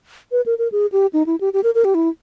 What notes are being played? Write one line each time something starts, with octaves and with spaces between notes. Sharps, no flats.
B4
A#4
A#4
G#4
G4
D#4
E4
G4
G4
A#4
A#4
G4
E4